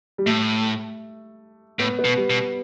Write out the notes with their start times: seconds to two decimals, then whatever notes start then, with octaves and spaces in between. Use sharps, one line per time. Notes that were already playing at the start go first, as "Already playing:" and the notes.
0.18 G3
0.26 A2 A3
1.79 A2 B3
1.99 B3
2.05 B2
2.17 G3
2.30 B2